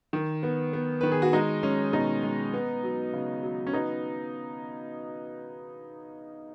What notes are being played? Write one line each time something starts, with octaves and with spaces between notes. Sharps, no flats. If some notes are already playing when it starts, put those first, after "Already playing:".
D#3
B3
B3
D#3 B4
G#4
F#4
G#3 D#4
G#3 C#4
B2 D#4
G#3
B3
F#3
C#3
F#3
C#4
B3 D#4